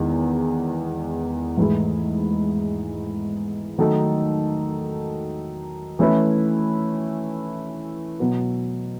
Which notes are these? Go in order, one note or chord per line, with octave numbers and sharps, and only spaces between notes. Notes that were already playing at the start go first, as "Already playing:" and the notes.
Already playing: E2 D#3 G#3
G#2 E3 A3 E4 G#4
D#3 F#3 A3 D#4 A4
E3 A3 C#4 E4 B4
B2 F#3 B3